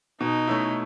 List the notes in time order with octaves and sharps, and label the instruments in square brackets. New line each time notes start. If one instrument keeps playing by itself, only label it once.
[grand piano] B2 [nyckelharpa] D#4
[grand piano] A3 C#4 E4